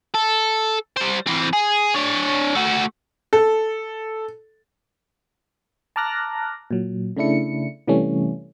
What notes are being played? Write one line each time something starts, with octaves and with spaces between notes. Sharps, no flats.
A4
G3 C5
E3 C4
G#4
D4 C#5
A3 F#4
A4
A5 A#5 D6 F6 F#6 A#6
A#2 F#3
C#3 A3 D4 E4 C#7
C3 E3 G3 A3 C#4